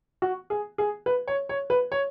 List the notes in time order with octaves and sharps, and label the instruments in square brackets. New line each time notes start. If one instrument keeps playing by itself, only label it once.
[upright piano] F#4
G#4
G#4
B4
C#5
C#5
B4
C#5